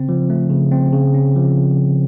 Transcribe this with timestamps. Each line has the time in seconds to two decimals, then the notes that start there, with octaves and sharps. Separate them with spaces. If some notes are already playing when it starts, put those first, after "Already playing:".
Already playing: C#3 C4
0.09 F3
0.30 A3
0.50 C#3
0.71 C4
0.93 C#3
1.14 C#4
1.36 F3